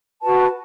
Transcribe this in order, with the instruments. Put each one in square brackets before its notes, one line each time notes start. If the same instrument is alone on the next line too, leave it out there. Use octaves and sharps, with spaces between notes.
[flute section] F#4 B4 A5